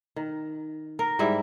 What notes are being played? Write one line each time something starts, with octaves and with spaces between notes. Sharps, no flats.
D#3
A#4
G#2 G3 E4 E5